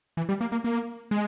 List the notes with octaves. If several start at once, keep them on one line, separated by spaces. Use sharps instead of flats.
E3
G3
A#3
A#3
A#3
G#3